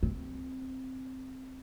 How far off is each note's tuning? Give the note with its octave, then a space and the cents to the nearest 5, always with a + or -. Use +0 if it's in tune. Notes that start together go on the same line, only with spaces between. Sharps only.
C4 +0